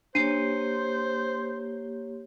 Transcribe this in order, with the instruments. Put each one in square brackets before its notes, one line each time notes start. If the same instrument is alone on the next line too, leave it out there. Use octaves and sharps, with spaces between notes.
[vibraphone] A#3 G4 C#5 [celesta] D4 C7 D#7 [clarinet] C5